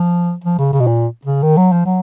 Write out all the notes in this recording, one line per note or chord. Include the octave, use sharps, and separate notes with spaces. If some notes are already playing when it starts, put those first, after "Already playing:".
Already playing: F3
F3
C#3
C#3
B2
A#2
C#3
D#3
F#3
F3
F#3